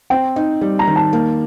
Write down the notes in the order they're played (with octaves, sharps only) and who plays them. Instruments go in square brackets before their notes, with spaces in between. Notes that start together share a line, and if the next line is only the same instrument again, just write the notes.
[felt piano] C4 [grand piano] G5
[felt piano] D#4
G3
[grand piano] A#5
[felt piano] D#3
[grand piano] A5
[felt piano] A#3